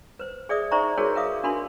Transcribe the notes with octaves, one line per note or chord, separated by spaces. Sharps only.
B4 C5
G#4 D5 E5 D#6
D#4 C5 D5 E5 A#5 C#6
D#4 F#4 G#4 A#4 C#5
A#4 B4 E5 F5 D6 D#6
D4 F#4 A#4 B5 C6